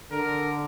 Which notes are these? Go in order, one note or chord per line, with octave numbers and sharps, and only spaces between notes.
D3 A#4